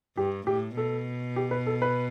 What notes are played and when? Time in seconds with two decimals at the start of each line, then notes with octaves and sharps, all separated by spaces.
0.17 G2 G4
0.47 A2 G4
0.76 B2 A4
1.36 G4
1.51 B4
1.67 A4
1.82 B4